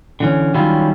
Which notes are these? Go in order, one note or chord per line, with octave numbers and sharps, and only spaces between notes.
D3 E3 C#4
D#3 F#3 G3 C#4 E4 F4